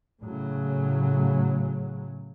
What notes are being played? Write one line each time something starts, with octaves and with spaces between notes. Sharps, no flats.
A2 C#3 F#3